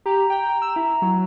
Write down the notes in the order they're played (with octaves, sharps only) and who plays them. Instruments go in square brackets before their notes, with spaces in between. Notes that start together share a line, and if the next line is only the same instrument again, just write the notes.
[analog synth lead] G4 [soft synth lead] A#5
[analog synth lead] G5
E6
E4
F#3